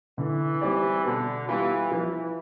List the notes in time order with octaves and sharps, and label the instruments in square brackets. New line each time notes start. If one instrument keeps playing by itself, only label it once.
[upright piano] D3 [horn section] E3
[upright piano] G3 C4 G4 D5
[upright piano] B2 [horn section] D3
[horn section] E3 [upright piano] G3 B3 F4
[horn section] E3 [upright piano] F3